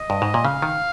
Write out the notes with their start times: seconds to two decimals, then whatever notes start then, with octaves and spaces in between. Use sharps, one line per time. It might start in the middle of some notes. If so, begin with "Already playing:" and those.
Already playing: D#5
0.10 G2
0.22 G#2
0.34 A#2
0.45 C#3 F5
0.62 D#3